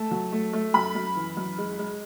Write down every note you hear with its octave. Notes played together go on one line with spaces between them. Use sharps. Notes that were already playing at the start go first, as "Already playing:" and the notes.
Already playing: A3 A5
F#3
A3
A3
F#2 B5
F#2
E3
F#2
G#3
G#3